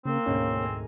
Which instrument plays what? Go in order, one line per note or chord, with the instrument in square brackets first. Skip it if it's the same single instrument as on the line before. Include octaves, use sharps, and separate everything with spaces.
[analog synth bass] C#3 [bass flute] A#3 [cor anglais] C4
[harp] D2 G#2 B2 [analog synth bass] C#4
[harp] A#4 G#5